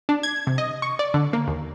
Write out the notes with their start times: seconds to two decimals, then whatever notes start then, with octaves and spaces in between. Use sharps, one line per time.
0.09 D4
0.23 G#6
0.47 C3
0.58 D#5
0.82 C#6
0.99 D5
1.14 D3
1.33 A#3
1.47 D#2